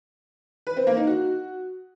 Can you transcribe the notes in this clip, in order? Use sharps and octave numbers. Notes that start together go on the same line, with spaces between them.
B4
C4
A#3
D#4
F#4